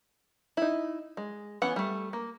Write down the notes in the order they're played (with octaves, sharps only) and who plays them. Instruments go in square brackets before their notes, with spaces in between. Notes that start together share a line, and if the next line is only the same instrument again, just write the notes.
[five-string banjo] D#4 E4
G#3
E3 B3 C#4 F#5
G3 A3
A#3